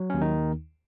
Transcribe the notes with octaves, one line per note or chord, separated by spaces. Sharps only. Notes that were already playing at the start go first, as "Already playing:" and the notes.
Already playing: F#3
D#2 C#4
D#3 D#4